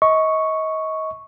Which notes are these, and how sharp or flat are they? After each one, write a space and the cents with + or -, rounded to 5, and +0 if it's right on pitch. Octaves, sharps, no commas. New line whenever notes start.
D#5 +30 C#6 +0